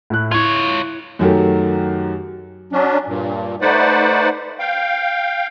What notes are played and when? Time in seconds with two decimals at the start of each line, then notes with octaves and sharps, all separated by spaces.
0.10 A2 E4 F#6
0.31 E4 F4 C#5 G#6
1.19 F#2 D#3 F#3 A3 G4
2.73 F#3 C#4 D4
3.07 G2 A#2
3.61 A3 D#4 B4 C5 D5 F#5
4.59 F5 G5